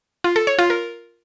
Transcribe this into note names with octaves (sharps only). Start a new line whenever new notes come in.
F4
A4
C#5
F4
A#4